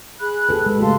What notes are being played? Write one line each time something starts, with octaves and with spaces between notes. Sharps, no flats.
G#4 B5 F#6
G4 A4 B4
G#3 B4
C#3 A3 F#4 F5 A5 C6